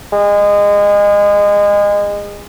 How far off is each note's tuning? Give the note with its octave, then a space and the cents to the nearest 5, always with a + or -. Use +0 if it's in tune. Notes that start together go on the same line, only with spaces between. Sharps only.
G#3 -25